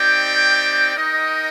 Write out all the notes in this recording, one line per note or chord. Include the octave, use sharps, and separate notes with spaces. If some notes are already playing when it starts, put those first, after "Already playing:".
Already playing: C4 D#4 G4 D5 G5
D#4 A#4 D#5 G5